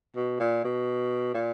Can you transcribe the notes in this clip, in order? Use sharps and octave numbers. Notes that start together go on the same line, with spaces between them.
B2
A#2
B2
A#2